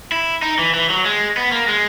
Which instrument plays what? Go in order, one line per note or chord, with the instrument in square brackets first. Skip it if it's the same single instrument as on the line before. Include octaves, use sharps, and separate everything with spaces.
[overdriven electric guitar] E4
D#4
E3
E3
F#3
G#3
B3
A#3
G#3